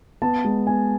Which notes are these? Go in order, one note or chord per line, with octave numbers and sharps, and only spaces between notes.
B3 A5
G#3
B3 G#5